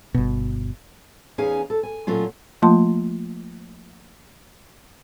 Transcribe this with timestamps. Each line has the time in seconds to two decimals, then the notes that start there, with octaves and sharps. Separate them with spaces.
0.14 G1 B2
1.38 E2 C#4 D#4 G#4 F5 G#5
1.70 A4
1.83 G#5
2.07 A#2 F#3 A3 C#4 F4
2.62 F3 A3 A#3 F4 A5 C6